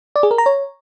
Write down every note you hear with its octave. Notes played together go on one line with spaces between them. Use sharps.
D5
G#4
A#4
A#5
C#5